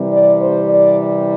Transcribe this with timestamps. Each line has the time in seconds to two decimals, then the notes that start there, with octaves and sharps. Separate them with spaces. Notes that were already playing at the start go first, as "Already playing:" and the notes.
Already playing: C3 E3 G3
0.13 D5
0.41 C5
0.69 D5